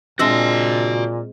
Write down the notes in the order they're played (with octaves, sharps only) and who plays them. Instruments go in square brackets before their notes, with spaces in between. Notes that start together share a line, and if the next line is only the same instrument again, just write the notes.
[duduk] A#2 [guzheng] G#3 C4 [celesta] D4 E6 A#6 [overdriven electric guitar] F#4 A5